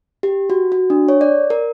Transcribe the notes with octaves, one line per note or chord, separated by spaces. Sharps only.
G4
F#4
F#4
D4
C#5
D5
A#4